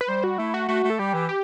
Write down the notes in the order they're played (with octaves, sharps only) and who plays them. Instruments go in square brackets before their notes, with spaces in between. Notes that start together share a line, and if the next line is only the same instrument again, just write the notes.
[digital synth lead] B4
[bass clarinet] G3 [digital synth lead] C5
[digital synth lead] F#4
[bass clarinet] A3 [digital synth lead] E4
[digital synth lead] F#4
[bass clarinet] A3 [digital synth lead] F#4
[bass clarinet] A3
[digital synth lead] A4
[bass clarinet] G3 [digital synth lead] G4
[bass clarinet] E3
[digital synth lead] G4